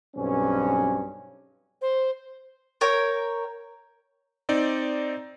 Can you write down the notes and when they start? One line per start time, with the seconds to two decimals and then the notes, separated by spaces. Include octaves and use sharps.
0.16 B1 G2 C4 C#4
1.82 C5
2.81 A#4 C#5 G5
4.49 C4 D#4 D5